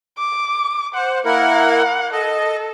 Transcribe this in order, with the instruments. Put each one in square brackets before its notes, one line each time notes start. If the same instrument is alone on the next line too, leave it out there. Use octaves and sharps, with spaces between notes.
[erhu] D6
[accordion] C5 [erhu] F#5
[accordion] A#3 E4 A#4 [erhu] F#5
[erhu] A4 [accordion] D#5